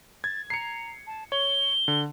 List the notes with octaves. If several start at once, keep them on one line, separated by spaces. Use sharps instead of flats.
G#6 A6
A#5 C7 C#7
A5
C#5 G7
D3